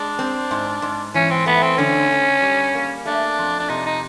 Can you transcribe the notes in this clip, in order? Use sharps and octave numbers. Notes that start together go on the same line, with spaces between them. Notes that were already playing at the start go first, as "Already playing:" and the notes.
Already playing: G#3 D4
C4
G#2
G#2
E3 C#4
C4
A3 B3
C4
D3 C#4
D3
G3
A#3
A3 D4
F2
D4
C3 D#4
D#4